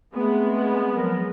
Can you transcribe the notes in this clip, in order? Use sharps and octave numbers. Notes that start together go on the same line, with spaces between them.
G#3 A3 B3 C4
F3 F#3 A#4